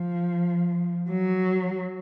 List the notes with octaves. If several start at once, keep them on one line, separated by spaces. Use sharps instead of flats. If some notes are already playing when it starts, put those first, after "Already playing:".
Already playing: F3
F#3